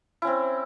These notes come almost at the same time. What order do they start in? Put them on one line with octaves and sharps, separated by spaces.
E4 C#4 C4